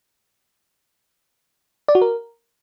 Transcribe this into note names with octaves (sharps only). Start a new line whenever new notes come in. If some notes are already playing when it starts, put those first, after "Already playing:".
D5
F#4
A#4